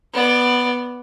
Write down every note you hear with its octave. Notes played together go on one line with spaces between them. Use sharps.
B3 D5